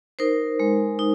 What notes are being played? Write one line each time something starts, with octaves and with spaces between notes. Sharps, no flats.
D#4 A#4 C5
G#3
D#4